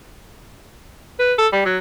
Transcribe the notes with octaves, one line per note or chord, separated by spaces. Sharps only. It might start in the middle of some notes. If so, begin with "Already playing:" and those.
B4
A4
G3
F#3